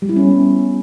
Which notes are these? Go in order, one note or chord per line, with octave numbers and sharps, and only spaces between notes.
G3
E4
C#4
B3
C#4